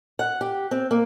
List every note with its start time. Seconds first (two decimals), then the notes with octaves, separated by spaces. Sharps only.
0.19 F#5
0.41 G4
0.71 C4
0.91 A#3